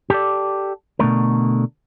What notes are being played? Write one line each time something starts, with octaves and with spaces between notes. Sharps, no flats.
G4 A4 D5
B2 D3 A3 A#4